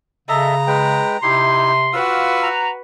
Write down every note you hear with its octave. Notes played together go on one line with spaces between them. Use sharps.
C#3 A4 D#5 E5 A#5
G#3 B4 G5
C3 D#4 E4 G4 C6
F4 F#4 B4 F5 E6
F#5 A#5